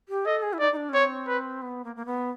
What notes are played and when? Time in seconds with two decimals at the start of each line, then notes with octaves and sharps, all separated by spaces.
0.09 G4
0.26 A4 D#5
0.43 G#4
0.53 E4
0.59 D#4 D5
0.72 D#4
0.77 D4
0.89 C#4
0.93 C4 C#5
1.28 B4
1.62 B3
1.84 A#3
1.96 A#3
2.06 B3